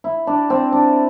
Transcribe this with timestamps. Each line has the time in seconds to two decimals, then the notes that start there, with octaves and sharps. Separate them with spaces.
0.04 E4
0.27 D4
0.50 C4
0.72 D4